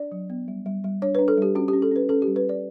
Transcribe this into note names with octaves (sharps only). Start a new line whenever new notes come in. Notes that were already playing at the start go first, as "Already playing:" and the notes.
Already playing: D4 D5
F#3
B3
G3
G3
G3
D4 C#5
B4
D4
A4
G3 G4
C#4 F#4
G4
C#4
A4
C#4 B4
C#4 A4
G4
G3
B4
C#4 D5